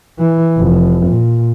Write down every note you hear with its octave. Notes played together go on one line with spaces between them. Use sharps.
E3
F1
A#2